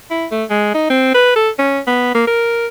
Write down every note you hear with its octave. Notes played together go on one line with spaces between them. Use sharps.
E4
A3
G#3
D#4
C4
B4
A4
C#4
B3
A#3
A#4